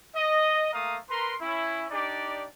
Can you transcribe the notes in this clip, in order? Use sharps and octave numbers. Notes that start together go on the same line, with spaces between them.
D#5
A3 A#3 F5 A#5 D#6
A#4 B4 A#5 C6
C#4 E4
D4 D#4 G4 D5